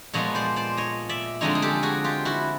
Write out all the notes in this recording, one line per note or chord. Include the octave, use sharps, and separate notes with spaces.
A#2 F3 G#3 B3 C#5 D#5
C5 D5
C5 D5
C#5 D#5
D5 E5
D3 F3 G#3 C4 D#4 C#5 D#5
G#4
G4 A4
F#4 G#4
F4 G4
E4 F#4